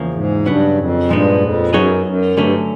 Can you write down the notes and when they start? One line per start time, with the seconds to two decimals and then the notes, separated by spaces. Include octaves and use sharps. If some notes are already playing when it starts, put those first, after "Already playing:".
Already playing: E2 C#3 F3 A#3
0.14 G#2
0.45 G2 C#3 F#3 B3
0.77 F2
1.09 G2 A#2 F3 G#3 B3 D#4
1.41 F2
1.73 F#2 F#3 B3 D#4 G#4 C#5
2.06 F#2
2.37 G2 D3 F#3 A3 C#4